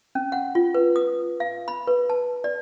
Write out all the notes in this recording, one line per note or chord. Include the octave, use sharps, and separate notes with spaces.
C#4
F#5
F4
B4
D#6
F5
B5
B4
A5
D5